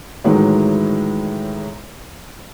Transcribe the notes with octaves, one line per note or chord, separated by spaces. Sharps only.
A2 D#3 E3 F#3 G#3